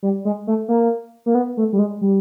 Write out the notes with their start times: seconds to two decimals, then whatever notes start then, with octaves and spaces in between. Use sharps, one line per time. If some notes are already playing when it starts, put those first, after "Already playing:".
0.03 G3
0.25 G#3
0.47 A3
0.68 A#3
1.26 A#3
1.35 B3
1.57 A3
1.73 G3
1.79 G#3
2.01 G3